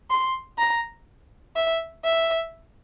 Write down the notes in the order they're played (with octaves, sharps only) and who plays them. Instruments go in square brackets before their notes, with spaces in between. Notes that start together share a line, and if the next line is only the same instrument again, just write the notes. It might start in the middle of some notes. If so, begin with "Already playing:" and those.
[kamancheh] C6
A#5
E5
E5